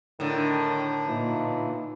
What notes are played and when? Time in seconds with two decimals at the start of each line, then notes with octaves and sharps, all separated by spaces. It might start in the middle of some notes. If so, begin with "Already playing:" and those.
0.20 A2 D3 D#3
1.08 A#2 E3 D#4 F4